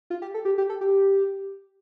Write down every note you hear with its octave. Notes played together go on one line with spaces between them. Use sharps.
F4
G4
A4
G4
G4
A4
G4